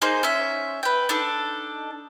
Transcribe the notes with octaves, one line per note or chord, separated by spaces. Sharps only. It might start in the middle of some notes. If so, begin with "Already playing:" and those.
A#3 D#4 G#4 C5
C#4 E5
B4 G5
D4 D#4 A4